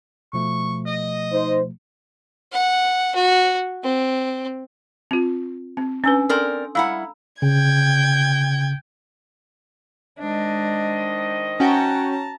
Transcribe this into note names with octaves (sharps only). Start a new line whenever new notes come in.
B2 F3 A3 C#6
D#5
D#4 C5
F#5
F#4
C4
C4 F4
C4
C#4 D4 B4 G#5 E6
C4 A4 A#4 D5 C6
G3 E4 F5 F#5 A#5 B5 E6
C#3 G5 G#6
D#3 G#3 D4 C5 D#5
C#4 F#4 G5 A5 A#5